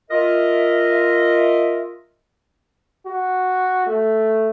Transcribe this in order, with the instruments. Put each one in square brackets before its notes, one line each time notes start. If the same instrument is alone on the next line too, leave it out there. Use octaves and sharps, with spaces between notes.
[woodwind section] F4 A#4 D#5 E5
[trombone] F#4
A3